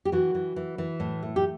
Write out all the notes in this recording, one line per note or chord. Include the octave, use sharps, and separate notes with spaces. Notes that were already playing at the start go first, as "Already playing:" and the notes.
G4
E3 F#4
E3
E3
E3
A2
A3
G4